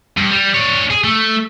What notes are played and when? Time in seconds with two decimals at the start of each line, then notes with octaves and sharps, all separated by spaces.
0.17 G2
0.31 G3
0.55 D4 C#5
0.90 G#4
1.04 A3